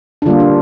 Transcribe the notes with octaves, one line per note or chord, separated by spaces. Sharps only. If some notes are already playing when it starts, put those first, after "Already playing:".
D4
D3 G3 A#3 F4
D4